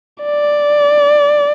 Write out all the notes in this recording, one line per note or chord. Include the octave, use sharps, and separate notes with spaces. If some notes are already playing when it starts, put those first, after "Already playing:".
D5